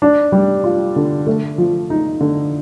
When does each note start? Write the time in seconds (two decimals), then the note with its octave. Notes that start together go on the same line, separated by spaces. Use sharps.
0.02 D4
0.32 G3
0.64 F4
0.96 D3
1.27 A3
1.58 F3
1.90 D#4
2.21 D3